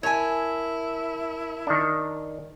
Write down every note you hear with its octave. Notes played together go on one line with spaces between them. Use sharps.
E4 A#4 C#5 G#5 A5
D#3 D4